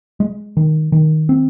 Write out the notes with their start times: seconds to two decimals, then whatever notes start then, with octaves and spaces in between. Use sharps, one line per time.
0.20 G#3
0.57 D#3
0.92 D#3
1.29 C4